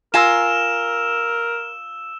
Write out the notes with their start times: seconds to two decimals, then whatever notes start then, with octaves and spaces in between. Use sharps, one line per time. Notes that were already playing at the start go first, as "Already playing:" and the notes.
0.14 F4 A#4 G#5 A#5 E6 E7